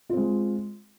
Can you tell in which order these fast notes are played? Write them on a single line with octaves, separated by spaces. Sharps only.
F4 C4 G#3